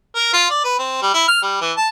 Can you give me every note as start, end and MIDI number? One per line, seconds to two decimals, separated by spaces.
0.15 0.31 70
0.34 0.46 65
0.50 0.59 74
0.64 0.75 71
0.79 1.00 60
1.02 1.10 55
1.14 1.25 64
1.28 1.42 89
1.42 1.58 55
1.61 1.72 52
1.77 1.89 81